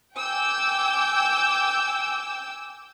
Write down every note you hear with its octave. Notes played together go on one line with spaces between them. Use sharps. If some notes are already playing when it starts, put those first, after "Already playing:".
G5 G#5 D6 E6 G6